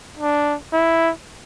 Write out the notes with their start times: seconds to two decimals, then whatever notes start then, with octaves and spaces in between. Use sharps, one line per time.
0.17 D4
0.73 E4